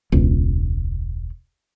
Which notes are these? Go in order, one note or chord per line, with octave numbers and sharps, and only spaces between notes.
E1 C#2